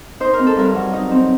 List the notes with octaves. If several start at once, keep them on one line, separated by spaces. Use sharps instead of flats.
D#4 C5
A#4
C4
A4
G2 A#4
F#3
D#4
C4